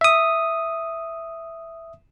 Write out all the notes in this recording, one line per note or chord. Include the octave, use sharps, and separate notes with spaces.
E5 D#6